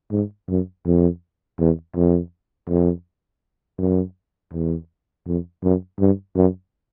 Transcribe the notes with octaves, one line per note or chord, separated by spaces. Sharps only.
G#2
F#2
F2
E2
F2
F2
F#2
E2
F2
F#2
G2
F#2